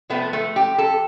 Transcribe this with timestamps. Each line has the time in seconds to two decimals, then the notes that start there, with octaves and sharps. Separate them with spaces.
0.10 C3 F3 A3 B3
0.33 A3
0.56 G4
0.78 A4